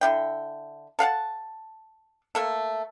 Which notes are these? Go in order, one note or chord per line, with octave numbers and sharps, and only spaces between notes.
D3 E4 G5
A4 F5 F#5 A5
A3 A#3 A4